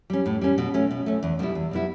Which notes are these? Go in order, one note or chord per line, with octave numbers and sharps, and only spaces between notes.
G3 C#4
A2
G3 C#4
B2
A3 C#4
B2
A3 C#4
E2
B2 G3 B3 E4
E2
B2 G3 B3 E4